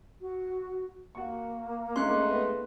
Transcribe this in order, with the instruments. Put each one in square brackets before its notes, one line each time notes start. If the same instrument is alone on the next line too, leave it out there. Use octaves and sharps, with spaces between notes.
[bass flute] F#4
[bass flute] A#3 [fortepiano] F#4 C#6
[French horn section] G#3 A3 D#4 [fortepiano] C#4 [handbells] C6 F#6
[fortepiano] B3